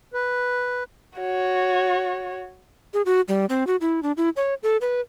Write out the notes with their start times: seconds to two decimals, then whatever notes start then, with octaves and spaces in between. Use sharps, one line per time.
0.14 B4
1.18 F#4 C#5
2.94 G#4
3.06 F#4
3.28 G3
3.49 C4
3.67 F#4
3.81 E4
4.03 D4
4.17 E4
4.36 C#5
4.63 A4
4.81 B4